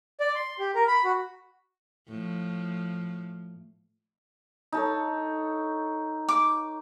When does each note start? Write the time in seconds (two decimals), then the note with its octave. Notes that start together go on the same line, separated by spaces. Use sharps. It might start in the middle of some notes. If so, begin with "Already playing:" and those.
0.20 D5
0.35 C6
0.59 G4
0.75 A#4
0.88 B5
1.04 F#4
2.09 A2 F3
4.72 D#4 A4 C#5
6.29 D6